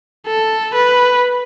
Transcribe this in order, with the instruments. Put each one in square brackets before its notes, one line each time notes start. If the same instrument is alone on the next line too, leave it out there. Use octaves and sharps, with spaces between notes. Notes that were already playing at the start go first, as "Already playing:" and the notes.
[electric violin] A4
B4